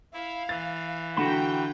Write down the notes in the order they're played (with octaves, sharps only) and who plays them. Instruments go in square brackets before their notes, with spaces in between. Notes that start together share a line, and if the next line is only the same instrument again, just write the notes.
[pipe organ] E4 [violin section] F5
[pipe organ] E3 [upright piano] A6
[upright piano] D3 E7 [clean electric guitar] F#4 F#5 B5 [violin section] G5 A#5 G6